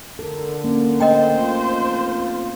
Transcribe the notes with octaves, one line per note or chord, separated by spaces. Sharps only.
D3 A4 A#4
A#3 C#4
A3 A#4 C5 D#5 G5
B1 F2 F4